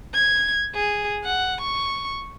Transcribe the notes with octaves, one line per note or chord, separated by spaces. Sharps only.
G#6
G#4
F#5
C#6